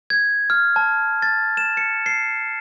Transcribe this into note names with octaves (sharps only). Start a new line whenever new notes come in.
G#6
F6
A5
A6
E7
C#7
C7